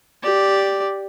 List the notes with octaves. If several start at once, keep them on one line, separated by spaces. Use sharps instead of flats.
G4 D5